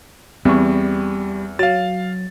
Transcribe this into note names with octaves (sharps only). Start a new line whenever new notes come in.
E2 G3 C4 C#6
F#3 F5 A6